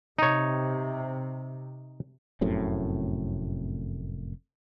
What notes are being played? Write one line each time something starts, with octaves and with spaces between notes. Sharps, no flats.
C3 D#4 C#5
F1 F#2 A2 C3